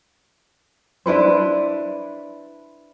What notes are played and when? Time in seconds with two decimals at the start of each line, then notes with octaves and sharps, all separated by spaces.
1.06 D4 E4 B4 C5